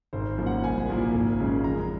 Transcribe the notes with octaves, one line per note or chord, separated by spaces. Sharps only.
G#1 C5
C5
F#2 F3 A#3
F#5
C2 G#5
A#2 F3 A#3
G#1
F#2 C#3 G#3
F2 A#5